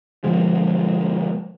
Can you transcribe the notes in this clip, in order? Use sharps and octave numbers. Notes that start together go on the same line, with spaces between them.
B2 D3 F3 G#3